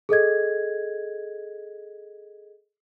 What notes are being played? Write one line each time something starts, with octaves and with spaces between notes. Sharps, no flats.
G#4 A4 D#5 G#6